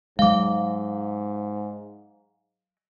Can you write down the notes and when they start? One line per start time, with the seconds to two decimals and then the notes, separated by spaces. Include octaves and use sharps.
0.19 G#2 F#3 G#3 F5 D6